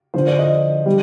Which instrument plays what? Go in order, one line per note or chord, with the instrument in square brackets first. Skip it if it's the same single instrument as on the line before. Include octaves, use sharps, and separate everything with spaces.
[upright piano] D3 F3 C5
D5
D#5
G3